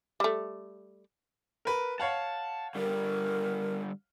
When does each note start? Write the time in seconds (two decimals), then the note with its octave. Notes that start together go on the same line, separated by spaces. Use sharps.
0.20 G3 A3
1.65 A#4 B4
2.00 C#5 F5 F#5 A5
2.75 D3 G3 A#4